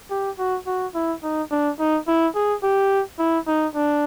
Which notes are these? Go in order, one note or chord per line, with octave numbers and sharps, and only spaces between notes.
G4
F#4
F#4
E4
D#4
D4
D#4
E4
G#4
G4
E4
D#4
D4